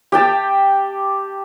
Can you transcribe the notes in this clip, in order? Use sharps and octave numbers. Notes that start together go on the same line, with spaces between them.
G4 G5 A5